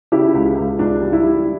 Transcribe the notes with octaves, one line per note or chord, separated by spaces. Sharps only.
C#3 E4 G4
C#2
C#2
C#2 D4
G3
E4
G3